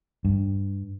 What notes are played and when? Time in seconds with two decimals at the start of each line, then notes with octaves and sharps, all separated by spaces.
0.25 G2